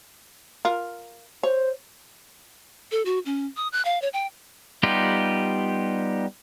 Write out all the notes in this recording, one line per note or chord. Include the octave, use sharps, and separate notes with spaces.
F4 A#4
C5 C#5
A4
F#4
C#4
D#6
F#6
F5
C#5
G5
G3 B3 D#4 F4 G4